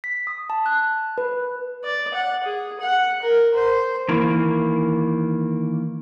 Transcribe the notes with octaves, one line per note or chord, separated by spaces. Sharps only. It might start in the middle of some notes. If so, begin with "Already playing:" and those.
B6
D#6
A5
F#6
B4
D5
F#5
G#4
F#5
A#4
C5
D#3 E3 A#3